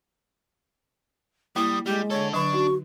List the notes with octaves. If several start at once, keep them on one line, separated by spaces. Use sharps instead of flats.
G3 A#3 E4 D#6
G3 G#3 G4
D4 A4 C#5
D3 F#3 D4 C#6
D#4 F#4